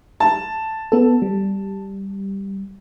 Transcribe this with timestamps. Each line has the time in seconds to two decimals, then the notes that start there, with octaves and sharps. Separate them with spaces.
0.20 A5
0.92 B3 A4
1.22 G3